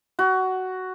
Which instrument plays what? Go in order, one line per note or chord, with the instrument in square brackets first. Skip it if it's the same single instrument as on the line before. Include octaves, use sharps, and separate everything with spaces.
[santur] F#4